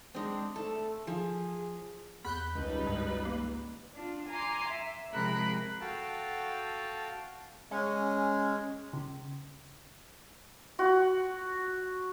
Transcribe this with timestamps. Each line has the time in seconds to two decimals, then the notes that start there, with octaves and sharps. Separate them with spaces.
0.14 G#3 C4 D4
0.56 A3 A4
1.07 F3 G#4
2.25 E2 B5 F#6 G6
2.55 G#1 C#2 G3 D#4 B4
2.87 G2
3.25 A#3
3.94 D4 F4
4.29 G#5 A#5 C6 D6
4.69 E5
5.12 C3 F3 G#3 A#4 B5 F#6
5.80 F#4 A4 F5 G5 A5
7.71 G#3 C#4
8.93 C#3
10.79 F#4